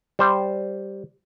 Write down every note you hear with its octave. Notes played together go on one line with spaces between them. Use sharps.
G3 C5